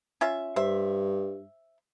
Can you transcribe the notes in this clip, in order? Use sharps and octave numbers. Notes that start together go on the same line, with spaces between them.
C#4 F4 E5
G2 C5 E5